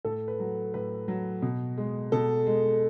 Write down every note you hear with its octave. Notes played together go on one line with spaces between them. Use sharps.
A2 A4
B4
F#3
A2 B4
F#3
B2
G#3
B2 A4
G#3